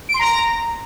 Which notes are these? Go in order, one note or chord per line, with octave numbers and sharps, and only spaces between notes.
D7
C6
A#5